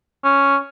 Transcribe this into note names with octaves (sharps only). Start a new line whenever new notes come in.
C#4